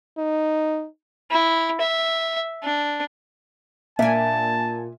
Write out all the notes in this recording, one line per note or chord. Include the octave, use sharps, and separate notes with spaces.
D#4
E4
E5
D4
A#2 A#3 D4 E5 G#5 A5